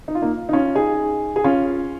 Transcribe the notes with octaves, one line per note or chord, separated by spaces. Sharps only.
D#4
F4
A#3 D#4
D#4
C#4 F4
D#4 G#4
G#4
C#4 F4